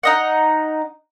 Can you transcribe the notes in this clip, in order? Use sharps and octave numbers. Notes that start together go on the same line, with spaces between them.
D#4 D#5 F#5